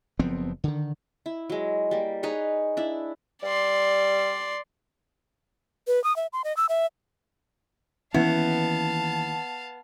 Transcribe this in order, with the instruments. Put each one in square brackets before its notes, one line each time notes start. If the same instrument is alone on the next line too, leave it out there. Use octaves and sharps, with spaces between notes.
[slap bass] F#1 F3 B3 C4
D3 D#3
[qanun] E4
F#3 G#3
G3 A#3
D#4 G#4 B4 C#5
D4 E4
[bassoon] G3 [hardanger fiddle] D5 C6
[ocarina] B4
D#6
E5
C6
D#5
E6
E5
[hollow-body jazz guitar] D#2 E4 [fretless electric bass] E3 C#4 [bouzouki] B3 [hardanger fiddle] F5 A5